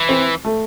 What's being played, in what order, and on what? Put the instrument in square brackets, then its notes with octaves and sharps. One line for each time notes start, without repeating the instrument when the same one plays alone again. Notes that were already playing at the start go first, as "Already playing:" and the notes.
Already playing: [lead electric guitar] E3
[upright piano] C4
A3